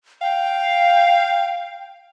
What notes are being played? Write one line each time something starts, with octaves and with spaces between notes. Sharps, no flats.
F5 G5